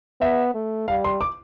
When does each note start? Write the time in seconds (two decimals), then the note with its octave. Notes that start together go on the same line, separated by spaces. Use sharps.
0.21 B3 E5
0.54 A3
0.88 G3 F5
1.04 C6
1.21 D6